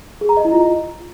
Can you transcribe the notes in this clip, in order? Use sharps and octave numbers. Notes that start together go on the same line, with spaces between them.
G#4
A#5
D#5
E4
F4